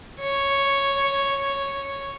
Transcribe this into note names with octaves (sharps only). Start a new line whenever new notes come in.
C#5